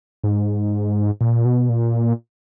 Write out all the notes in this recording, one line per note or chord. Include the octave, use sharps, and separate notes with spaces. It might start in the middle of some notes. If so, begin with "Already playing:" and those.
G#2
A#2
B2
A#2